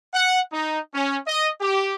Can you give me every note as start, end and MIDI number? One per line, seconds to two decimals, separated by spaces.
0.13 0.40 78
0.52 0.79 63
0.94 1.18 61
1.26 1.49 75
1.61 1.95 67